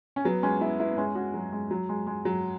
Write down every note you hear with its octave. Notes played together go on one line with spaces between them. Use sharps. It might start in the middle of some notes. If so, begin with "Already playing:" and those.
C#4
F#3 B3
G#3 C#4
B3 E4
B3 E4
B3
G#3 C#4
C#4 F#4
F#3
G#3
F#3
G#3
G#3
F#3